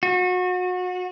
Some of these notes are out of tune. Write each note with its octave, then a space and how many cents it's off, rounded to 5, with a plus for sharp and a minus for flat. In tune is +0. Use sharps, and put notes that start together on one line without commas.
F#4 -30